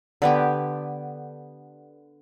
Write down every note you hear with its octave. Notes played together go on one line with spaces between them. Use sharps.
D3 B3 G4